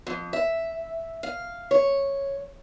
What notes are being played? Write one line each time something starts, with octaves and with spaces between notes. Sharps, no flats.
F2
E5
F5
C#5